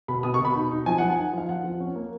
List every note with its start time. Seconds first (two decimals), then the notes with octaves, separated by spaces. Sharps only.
0.08 B2 B5
0.23 B2 D#6
0.34 C#6
0.40 B2
0.45 B5
0.55 D#4
0.71 D#4
0.86 F3 G#5
0.98 F3 F#5
1.10 G#5
1.17 D#4
1.33 F3 F5
1.49 F3 F#5
1.64 F3
1.80 C#4
1.95 A#3